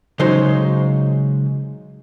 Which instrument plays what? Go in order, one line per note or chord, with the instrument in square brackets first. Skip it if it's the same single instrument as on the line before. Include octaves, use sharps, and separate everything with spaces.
[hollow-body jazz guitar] C#3 F#3 G#3 D#4 C5